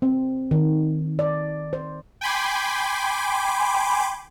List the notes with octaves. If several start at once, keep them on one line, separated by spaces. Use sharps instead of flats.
C4
D#3
D5
C5
G5 G#5 B5 C6 D6